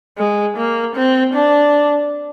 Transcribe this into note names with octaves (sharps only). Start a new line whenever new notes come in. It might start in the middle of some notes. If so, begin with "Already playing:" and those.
G#3
A#3
C4
D4